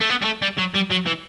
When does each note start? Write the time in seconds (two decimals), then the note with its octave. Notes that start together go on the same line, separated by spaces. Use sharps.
0.01 A3
0.10 B3
0.22 G3
0.25 A3
0.42 G3
0.58 F#3
0.74 G3
0.90 F#3
1.06 E3